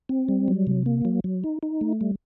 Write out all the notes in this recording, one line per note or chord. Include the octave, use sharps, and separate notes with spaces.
C4
G3
F#3
C3
A#3
F#3
F#3
D#4
D#4
A3
G3